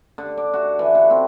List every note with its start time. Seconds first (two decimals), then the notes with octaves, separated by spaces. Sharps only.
0.18 D3
0.38 D5
0.53 F#4
0.79 E3
0.95 D3
1.10 C4